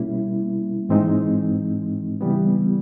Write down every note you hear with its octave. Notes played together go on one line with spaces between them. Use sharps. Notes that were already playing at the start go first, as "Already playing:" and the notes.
Already playing: B2 G3 A#3 C#4 E4
G#2 E3 G#3 C4 D#4
C#3 E3 G3 B3